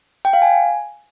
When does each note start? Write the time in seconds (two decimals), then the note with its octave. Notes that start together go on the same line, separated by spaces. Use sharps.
0.25 G5
0.33 F5
0.42 G#5